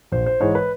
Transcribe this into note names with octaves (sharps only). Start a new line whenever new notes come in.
A#1 C5
C5
G#2 E3 G#3 C#5
B4